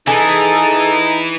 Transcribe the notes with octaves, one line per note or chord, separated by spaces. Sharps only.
E3 D#4 G#4 A4